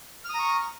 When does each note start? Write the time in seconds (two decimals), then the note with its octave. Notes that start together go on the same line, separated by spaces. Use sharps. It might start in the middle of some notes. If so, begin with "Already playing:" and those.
0.25 F6
0.29 D#6
0.34 A#5
0.39 C#6